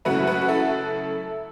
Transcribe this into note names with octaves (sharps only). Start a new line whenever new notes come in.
F#2 C#3 A3 E4 F#4 B4
F#4 B4
F#4
E4 A4